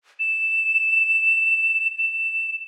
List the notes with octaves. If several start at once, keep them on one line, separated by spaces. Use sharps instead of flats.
E7
E7